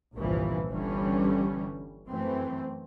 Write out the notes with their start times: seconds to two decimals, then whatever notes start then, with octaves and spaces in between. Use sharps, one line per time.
0.15 G1 C2 G2 A#2 E3 F3
0.69 G1 D3 E3 G3 C#4
2.07 F#2 E3 A3 C4